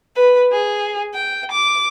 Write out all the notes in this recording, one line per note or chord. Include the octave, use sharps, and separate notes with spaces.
B4
G#4
G5
D6